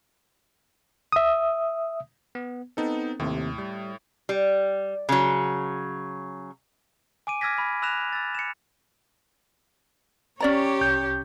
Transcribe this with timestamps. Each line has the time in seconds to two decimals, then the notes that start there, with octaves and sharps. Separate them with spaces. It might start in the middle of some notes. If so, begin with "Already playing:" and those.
1.12 E5 D#6
2.35 B3
2.77 B3 C4 D#4 A4
3.20 D#2 A2 C3
3.58 G3
4.29 G3
5.09 C#3 F#3
7.27 G#5 D6 D7 D#7
7.41 D6 E6 F6 G#6 A#6 B6
7.58 B5
7.82 B5 E6 F#6 A#6 E7 F7
8.13 E6 A6
8.35 C#7 E7
10.40 C#4 G4 C#5 D5 A#5
10.81 C2 G6